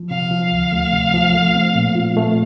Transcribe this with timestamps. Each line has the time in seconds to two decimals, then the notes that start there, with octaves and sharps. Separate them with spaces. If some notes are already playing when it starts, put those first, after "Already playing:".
Already playing: F3
0.11 C3 F5
0.31 F3
0.52 D2
0.72 A3
0.93 C3
1.14 F3
1.35 A3
1.55 C4
1.75 A#2
1.95 F4
2.17 A3